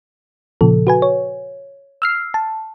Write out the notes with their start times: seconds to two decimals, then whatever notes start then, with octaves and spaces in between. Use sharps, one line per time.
0.61 A#2 C#3 F3 A4
0.87 F#4 B4 G#5
1.02 C#5
2.02 E6 F6 C7
2.34 A5